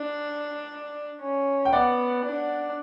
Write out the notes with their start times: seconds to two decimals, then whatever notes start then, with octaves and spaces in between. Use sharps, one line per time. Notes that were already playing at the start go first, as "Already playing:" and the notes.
Already playing: D4
1.21 C#4
1.65 G5
1.73 B3 D5 F#5
2.25 D4